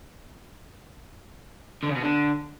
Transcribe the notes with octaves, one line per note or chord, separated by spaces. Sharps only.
D3
C#3
B2
D3